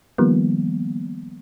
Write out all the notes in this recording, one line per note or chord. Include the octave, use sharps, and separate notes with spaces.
D#3 F3 G3 A#3 B3